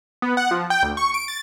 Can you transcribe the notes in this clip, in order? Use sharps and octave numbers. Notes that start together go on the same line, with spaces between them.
B3
F#5
F3
G5
D2
C#6
D7
A6